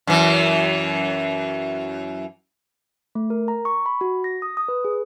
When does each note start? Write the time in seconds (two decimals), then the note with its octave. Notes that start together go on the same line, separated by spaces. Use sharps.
0.07 F#2 E3
3.15 A3
3.30 A#4
3.48 A#5
3.65 C#6
3.86 B5
4.01 F#4
4.24 A#6
4.42 D#6
4.57 D#6
4.68 B4
4.85 G#4